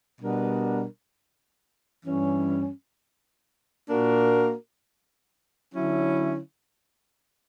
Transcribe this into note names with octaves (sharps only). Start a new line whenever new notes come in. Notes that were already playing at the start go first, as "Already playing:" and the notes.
B2 G3 B3 D4 A#4
G2 E3 G3 C#4
A#2 A#3 D4 F#4 A#4
D3 F#3 C#4 E4